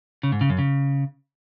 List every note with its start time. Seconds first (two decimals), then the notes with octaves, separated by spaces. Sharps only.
0.23 C#3
0.32 G#2
0.41 C#3
0.50 F#2
0.58 C#3